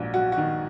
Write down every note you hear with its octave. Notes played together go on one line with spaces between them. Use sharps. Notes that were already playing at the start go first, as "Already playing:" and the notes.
Already playing: A#1 G#2 F#3
F#3 F#4
F#4
D#3